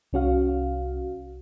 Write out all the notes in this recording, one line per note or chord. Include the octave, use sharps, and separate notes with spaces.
C2 C#4 F#4 F5